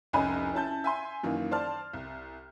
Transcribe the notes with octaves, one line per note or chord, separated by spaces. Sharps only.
F1 C2 C#4 D#5 G#5 B5
C#4 E4 A5 G6
E5 G#5 C6
F#2 D#3 E3 A#3
C5 D5 A5 F6
C2